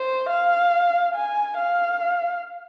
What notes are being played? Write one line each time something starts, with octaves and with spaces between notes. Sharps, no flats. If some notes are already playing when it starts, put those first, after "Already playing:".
Already playing: C5
F5
G#5
F5